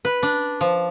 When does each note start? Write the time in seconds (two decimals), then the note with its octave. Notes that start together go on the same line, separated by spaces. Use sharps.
0.05 B4
0.23 D4
0.61 F3